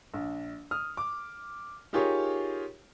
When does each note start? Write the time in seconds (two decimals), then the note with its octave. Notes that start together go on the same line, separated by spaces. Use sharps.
0.14 A#1
0.71 D#6 F6
0.97 D6
1.93 D#4 F4 G4 G#4 A#4 C#5